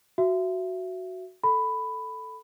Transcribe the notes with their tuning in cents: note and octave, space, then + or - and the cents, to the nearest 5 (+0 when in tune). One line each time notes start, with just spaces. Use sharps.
F#4 +0 E5 +25
A4 +0 B5 +10